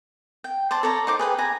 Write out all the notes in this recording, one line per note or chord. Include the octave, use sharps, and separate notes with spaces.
G5
C5 D5 A5
A4 C#5 D5 A#5
D#4 C5 D6
G#4 B4 G5
G#5 A#5